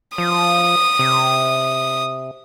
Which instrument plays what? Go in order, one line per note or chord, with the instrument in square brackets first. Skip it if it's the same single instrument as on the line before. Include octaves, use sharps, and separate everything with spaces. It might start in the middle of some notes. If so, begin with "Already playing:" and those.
[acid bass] F3 [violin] D#6
[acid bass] C3